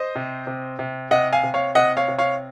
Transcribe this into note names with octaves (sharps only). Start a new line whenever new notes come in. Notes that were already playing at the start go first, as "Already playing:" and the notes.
Already playing: C5 D#5
C3
C3
C3
C3 D#5 F#5
F5 G#5
C3
C#5 F5
C3 D#5 F#5
C#5 F5
C3
C#5 F5